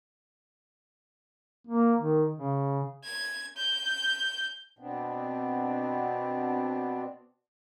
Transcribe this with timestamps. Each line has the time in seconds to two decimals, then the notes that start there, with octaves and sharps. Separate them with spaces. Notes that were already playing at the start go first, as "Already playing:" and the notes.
1.67 A#3
2.00 D#3
2.37 C#3
3.04 G#6
3.56 G6
4.79 B2 B3 C4 D4